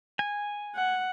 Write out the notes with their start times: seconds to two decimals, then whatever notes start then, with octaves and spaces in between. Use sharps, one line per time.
0.19 G#5
0.76 F#5